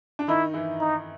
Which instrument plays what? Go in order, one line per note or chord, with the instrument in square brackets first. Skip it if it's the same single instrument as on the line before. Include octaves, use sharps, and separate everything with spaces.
[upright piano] D4
[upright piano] D#3 D#4 [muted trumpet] E4
[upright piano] E3 E4
[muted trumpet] D#4